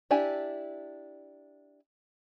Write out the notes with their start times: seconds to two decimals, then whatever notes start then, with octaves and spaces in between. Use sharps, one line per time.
0.11 D4 E4 G4 G#5